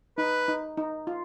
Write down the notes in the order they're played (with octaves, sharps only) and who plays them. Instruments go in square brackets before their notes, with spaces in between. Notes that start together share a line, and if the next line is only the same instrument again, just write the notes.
[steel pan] D#4 [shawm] B4
[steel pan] D#4
D#4
F4